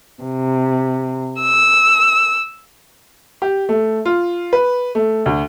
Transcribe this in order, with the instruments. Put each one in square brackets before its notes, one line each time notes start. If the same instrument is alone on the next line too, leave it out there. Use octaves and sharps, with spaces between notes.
[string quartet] C3
E6
[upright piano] G4
A3
F4
B4
A3
D2